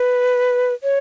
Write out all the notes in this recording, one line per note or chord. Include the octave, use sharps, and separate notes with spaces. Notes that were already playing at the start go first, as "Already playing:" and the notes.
Already playing: B4
C#5